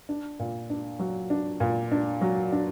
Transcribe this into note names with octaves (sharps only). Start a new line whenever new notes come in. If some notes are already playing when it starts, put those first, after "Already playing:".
D4
A#2
D4
F#3
D4
A#2
D4
F#3
D4